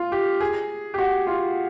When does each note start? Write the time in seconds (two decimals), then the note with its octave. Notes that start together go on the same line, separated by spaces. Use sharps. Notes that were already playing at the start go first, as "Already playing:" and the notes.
Already playing: F4
0.12 G4
0.40 G#4
0.94 G4
0.98 F#4
1.27 F4